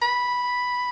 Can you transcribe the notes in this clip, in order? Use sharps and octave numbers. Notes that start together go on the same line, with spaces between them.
B5